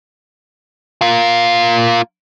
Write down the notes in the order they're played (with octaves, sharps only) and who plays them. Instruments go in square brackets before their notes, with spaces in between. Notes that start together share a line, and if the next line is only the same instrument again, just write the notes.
[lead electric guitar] A#3 F4